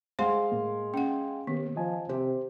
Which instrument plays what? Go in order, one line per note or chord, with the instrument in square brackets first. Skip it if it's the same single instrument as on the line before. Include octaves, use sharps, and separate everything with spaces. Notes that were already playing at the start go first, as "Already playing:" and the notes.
[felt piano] G#3 F5 C6 [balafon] C5 F#5
[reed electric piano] A2 A#3
[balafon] C#4 F#5 [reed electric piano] G5
[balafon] D#3 [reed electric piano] A#3 B3 G4
[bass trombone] F3 [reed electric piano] D#5 G#5 A5
[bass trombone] C3 [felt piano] G4 [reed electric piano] C5